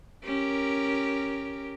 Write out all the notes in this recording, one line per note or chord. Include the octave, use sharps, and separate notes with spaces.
C#4 G4 A#4